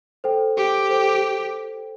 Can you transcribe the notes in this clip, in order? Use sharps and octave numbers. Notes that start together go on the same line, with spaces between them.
A4 C5 G5
G4
A4 C5 G5